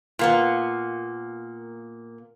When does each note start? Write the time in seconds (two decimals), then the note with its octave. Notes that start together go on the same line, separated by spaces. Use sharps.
0.19 A#2 A#3 B3